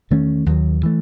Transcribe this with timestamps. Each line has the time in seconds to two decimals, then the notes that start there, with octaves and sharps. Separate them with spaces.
0.11 E2 D#3 A3 C#4
0.46 D#2 D#3 F#3
0.83 E3 A3